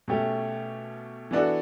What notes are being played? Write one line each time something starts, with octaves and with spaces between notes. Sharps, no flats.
B2 A3 C#4 G4
E3 B3 D4 F#4 A4